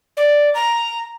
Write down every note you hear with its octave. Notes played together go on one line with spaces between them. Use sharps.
D5
A#5